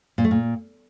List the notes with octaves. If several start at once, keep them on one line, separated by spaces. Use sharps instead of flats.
A#2
A3
A#2